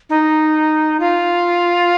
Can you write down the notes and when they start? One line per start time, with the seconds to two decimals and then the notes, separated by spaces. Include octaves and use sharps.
0.10 D#4
1.00 F4